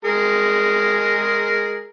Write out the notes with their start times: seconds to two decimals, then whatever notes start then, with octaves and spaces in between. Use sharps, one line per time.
0.05 G#3 G#4 A#4